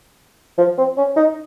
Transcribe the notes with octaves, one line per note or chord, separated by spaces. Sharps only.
F3
C4
C#4
D#4